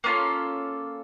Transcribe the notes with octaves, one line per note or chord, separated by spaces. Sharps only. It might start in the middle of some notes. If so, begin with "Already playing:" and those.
A#3 C#4 F4 A4